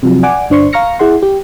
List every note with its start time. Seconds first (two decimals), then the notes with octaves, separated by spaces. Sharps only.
0.03 C3 F3 F#3
0.23 D5 F#5 G#5 D6
0.50 G1 D4 C5 C6 C#6
0.73 F5 A#5 C#6 F6 A#6 C#7
0.99 E4 G#4 F#5 C6
1.22 G4